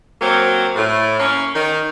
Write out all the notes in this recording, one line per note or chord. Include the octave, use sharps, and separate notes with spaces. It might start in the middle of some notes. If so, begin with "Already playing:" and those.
F#3 A#3 C4
A2
A#3 C#4
D#3